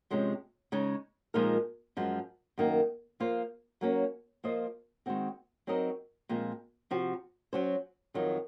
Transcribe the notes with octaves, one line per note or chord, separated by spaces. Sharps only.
C3 F3 G#3 C#4
C#3 G#3 D#4
A#2 F3 G#3 D#4 A#4
F#2 F3 G#3
F#2 D#3 A#3
F3 A#3 F4 C5
F#3 A#3 C#4
F3 A#3 F4 C5 D#5
D#3 G#3 C4 F#4
F#3 C4 D#4 A#4 D#5
A#2 F3 G#3 C4
C3 F3 C4 F#4
F#3 C#4 F#4 C5
F2 D#3 F#3